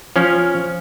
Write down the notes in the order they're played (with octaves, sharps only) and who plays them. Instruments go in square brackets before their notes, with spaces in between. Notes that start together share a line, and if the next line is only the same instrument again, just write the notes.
[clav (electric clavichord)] F3 C#4